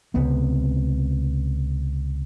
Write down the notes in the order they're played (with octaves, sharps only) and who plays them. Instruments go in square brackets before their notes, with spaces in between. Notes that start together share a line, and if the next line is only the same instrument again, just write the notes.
[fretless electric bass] C#2 C3 B3 C4